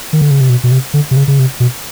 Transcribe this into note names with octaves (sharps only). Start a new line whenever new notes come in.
D#3
D3
C#3
C3
B2
B2
C3
D3
C3
C#3
C#3
C3
B2